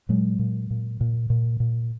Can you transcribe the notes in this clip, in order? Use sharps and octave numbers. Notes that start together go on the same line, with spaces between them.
A#2 F#3 G#3
A#2
A#2
A#2
A#2
A#2